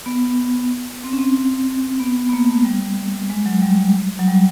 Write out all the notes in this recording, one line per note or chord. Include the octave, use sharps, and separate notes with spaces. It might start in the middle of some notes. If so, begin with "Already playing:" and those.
B3
C4
C#4
C4
B3
B3
A#3
A3
G3
G#3
F#3
G3
F#3
G3